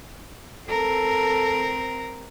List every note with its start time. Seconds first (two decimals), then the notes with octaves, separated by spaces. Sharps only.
0.68 C4 A4 A#4